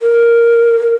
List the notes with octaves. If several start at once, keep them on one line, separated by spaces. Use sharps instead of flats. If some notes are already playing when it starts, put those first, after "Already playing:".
A#4